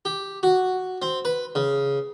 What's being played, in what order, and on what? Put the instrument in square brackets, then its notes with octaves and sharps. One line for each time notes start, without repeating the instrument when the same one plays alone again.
[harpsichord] G4
F#4
C4
B4
C#3